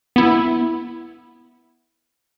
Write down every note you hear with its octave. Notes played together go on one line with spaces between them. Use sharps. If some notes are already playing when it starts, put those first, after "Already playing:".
B3 E4